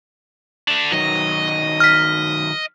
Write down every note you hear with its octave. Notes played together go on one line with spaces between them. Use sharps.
A3 D4
D#3 F#3 D#5
F6 B6